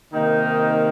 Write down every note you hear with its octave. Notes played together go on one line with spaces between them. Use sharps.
C3 D#3 A#3 D#4